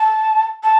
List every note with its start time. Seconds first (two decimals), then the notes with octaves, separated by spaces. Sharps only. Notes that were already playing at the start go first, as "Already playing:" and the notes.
Already playing: A5
0.63 A5